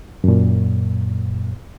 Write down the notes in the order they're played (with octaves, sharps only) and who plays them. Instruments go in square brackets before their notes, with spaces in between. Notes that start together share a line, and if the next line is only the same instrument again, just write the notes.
[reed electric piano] F#2 A#2